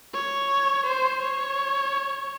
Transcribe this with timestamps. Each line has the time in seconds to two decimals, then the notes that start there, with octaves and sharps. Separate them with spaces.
0.14 C#5
0.86 C5
1.22 C#5